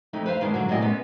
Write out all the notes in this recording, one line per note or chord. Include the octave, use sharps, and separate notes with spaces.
F2 A3 D#4
B4 C5 E5 F5
G2 D#3 G3 G#3 D4 D#5
D3 F#3 F#4
F#2 A2 C3 D5 D#5 G#5
G#3 B3 C#4